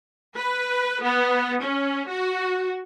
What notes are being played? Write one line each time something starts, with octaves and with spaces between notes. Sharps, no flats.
B4
B3
C#4
F#4